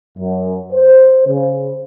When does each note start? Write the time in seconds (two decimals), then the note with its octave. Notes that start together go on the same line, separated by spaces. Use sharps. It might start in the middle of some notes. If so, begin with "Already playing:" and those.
0.17 F#2
0.73 C5
1.28 C#3